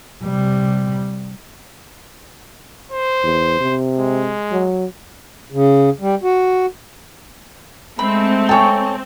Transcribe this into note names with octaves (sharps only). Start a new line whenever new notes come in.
C3 G3
C5
E2
C3
G#3
F#3
C#3
G3
F#4
G#3 A3 C4 B5
A4 C#5 G5 G#5 C#6